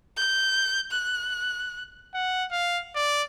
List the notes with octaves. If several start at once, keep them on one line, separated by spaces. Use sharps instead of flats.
G6
F#6
F#5
F5
D5